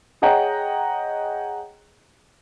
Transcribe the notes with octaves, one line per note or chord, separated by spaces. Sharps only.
G#4 C#5 D#5 F#5 G5 A#5